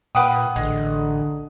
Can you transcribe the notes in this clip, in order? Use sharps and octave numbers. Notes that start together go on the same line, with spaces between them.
A#2 G4 B4 F5 F#5 D#6
A1 D3 G#3